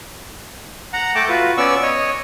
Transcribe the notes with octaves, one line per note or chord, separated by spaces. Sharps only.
F#5 A#5
A3 G5 A5 D6
F4 F#4 B4
B3 C#4 D5 C#6 E6
C#5 D#5